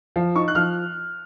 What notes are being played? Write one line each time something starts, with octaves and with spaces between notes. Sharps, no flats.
F3
D#4 C#6
F#6
F3 F6